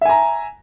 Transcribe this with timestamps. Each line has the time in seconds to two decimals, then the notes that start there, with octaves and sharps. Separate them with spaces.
0.01 E5
0.05 G#5
0.09 A#5